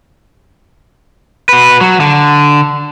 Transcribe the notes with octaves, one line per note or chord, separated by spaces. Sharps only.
F#4 B4
F#3
D3